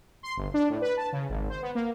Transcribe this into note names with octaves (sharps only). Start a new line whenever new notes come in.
C6
G1
D4
A2
B4
A5
C#3
G#1
C5
B3
A#3